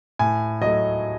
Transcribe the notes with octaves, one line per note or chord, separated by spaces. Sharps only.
A2 G#5
F#3 A3 D#5